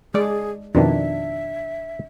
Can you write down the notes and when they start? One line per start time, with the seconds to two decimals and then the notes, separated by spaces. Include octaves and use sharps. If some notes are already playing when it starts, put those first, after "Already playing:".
0.14 G#3 G#4 D5
0.75 F2 B2 D#3 D4 E5